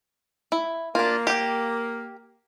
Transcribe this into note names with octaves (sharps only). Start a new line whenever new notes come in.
E4
A#3 D4 F4
G4 G5